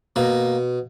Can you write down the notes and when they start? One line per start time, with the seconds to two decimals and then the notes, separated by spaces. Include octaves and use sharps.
0.16 B2 A#3